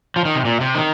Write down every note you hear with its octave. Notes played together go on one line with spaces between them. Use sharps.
F3
D#3
C3
A#2
C3
D#3